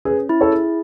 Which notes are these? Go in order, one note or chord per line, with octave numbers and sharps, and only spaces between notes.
C#4 G#4 B4
E4
A4 C#5
G#4